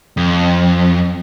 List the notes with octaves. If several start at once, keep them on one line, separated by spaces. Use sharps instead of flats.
F2